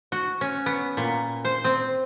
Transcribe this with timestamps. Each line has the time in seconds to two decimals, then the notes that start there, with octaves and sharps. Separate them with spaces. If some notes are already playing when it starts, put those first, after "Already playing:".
0.12 F#4
0.41 C#4
0.66 B3
0.97 A#2
1.45 C5
1.64 C4